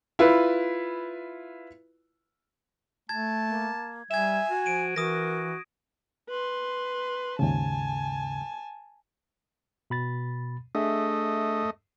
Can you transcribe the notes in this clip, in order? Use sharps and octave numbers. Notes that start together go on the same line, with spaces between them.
E4 F4 B4
A3 A5 G#6
A#3
G3 E5 G#5 G#6 E7
F#4
F3 D7 D#7
E3 F#4 A#4 D#6 A#6
B4 C6
D#2 G#2 C#3 G#5 A5
B2 B5 A6
A3 D4 G#4 D#5 E5